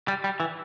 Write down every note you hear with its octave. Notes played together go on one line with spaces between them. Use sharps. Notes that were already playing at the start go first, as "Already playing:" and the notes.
G3
G3
E3